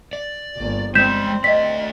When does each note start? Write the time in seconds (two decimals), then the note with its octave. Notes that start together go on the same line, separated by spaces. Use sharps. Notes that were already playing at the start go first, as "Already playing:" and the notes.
0.13 D5
0.57 G1 A#3
0.95 G#3 C4 D5 G6 B6 E7
1.44 A3 D5 D#5 B6